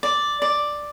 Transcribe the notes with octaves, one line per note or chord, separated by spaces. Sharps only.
D5
D5